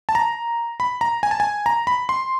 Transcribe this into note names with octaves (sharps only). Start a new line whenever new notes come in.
A5
A#5
B5
A#5
G#5
A5
G#5
A#5
B5
C6